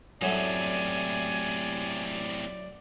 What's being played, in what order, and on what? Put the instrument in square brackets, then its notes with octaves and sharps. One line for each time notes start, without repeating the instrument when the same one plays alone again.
[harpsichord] F#2 F#3 A3 [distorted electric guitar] A2 C3 [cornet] D5 [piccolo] G#5